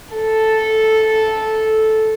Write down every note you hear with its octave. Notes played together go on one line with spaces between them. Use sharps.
A4